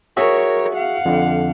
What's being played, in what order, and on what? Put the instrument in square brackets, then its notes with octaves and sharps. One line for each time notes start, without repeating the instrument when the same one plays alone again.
[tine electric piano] F#4 G#4 E5 [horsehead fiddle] A#4 C#5
[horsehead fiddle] F5 F#5
[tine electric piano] F2 D3